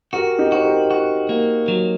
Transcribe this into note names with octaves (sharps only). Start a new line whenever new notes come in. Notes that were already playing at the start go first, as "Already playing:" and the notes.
F#4 G4 A#4
D#4 G4
F#4 C5
G4 A#4
F#4
A#3
F#3